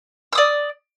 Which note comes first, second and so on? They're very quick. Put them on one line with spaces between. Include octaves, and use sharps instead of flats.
E6 D#6 D5